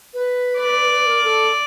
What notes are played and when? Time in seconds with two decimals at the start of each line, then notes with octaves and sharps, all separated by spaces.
0.14 B4
0.58 D5
1.02 B4
1.06 A#4
1.24 A4